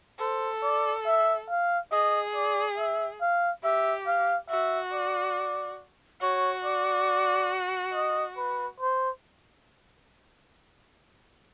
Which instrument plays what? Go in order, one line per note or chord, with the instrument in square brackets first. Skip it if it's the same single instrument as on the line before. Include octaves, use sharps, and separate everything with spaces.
[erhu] A4 [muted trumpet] C5
[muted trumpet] D5
E5
F5
[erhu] G#4 [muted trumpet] D#5
[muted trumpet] D5
E5
F5
[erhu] G4 [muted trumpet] E5
[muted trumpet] F5
[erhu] F#4 [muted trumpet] E5
[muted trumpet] D5
[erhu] F#4 [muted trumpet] C#5
[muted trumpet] D5
D#5
B4
C5